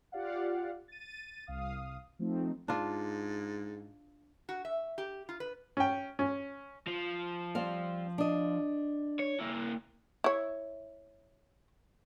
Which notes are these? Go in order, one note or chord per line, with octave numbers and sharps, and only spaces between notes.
F4 G4 D5 F5 F#5
A6 D#7
C2 F5 D#6
F3 A3 C4 D#4
G#2 D4 F4
F#4
E5
G4
F4
B4
C#4 G5
C#4
F3
G3 C4 F5
D4 D#5
C#5
A#3 E4
E4 C#5